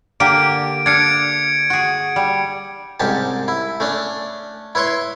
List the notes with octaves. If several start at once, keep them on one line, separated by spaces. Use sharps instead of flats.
D3 A#3 G4 D7
D4 F5 G#6 C#7 D7
F#4 G#4
G3
C2 G#2 C#4 G4 A5
E4
A3 C#4 D4
E4 B4 C#5 C6 C#6